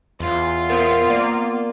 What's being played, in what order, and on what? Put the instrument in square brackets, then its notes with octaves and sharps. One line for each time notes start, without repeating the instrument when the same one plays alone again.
[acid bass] E2 [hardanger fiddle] F4
[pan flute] B3 [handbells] A#4 C5 E5
[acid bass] A#3 [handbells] D5